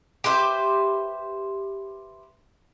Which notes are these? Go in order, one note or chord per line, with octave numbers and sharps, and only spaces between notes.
G4 B4 C5 E5